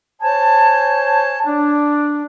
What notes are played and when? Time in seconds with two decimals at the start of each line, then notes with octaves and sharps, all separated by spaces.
0.22 C5 C#5 G#5 A5
1.47 D4